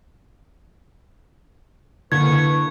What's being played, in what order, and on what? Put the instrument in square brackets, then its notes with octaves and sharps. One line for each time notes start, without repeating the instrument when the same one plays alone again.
[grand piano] D3 A#3 [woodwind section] E4 B4 C#6 [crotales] G#6